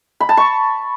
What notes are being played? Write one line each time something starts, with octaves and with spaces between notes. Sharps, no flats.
B5
A5
C#6